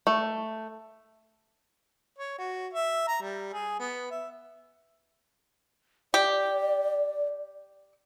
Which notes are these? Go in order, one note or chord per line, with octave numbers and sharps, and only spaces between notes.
A3
C#5
F#4
E5
A#5
G3
G#4
B3
E5
G4 D5